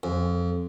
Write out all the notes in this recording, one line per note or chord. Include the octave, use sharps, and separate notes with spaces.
F2